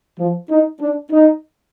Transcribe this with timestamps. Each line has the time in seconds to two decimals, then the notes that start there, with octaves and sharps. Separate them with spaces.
0.18 F3
0.50 D#4
0.80 D4
1.11 D#4